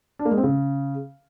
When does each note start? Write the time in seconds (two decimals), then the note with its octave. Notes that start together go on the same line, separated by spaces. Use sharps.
0.19 D4
0.25 A#3
0.31 G#3
0.38 C4
0.44 C#3